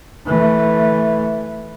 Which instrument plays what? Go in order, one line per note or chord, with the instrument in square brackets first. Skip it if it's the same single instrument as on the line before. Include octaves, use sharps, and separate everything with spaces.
[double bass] E3 A3